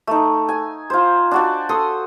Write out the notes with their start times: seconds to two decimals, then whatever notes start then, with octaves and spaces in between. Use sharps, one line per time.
0.07 A3 D#4
0.49 G#5
0.90 F4 C5
1.31 D4 F#4 D5
1.69 A4 C6 D#6